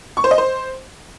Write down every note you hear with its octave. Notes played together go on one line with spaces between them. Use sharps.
C#6
C5
D#5
C5